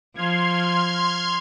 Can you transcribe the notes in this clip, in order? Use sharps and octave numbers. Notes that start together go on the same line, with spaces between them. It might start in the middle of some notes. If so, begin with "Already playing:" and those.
F3 C6 F6 G#6